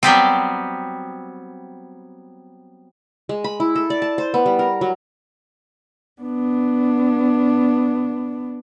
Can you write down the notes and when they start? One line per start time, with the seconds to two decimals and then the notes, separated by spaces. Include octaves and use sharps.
0.03 F#3 G3 B3 C4
3.29 G#3
3.44 B5
3.60 E4
3.76 A4
3.90 D5
4.02 A5
4.18 C5
4.34 B3
4.46 G3
4.59 A#4
4.81 F#3
6.21 B3 D4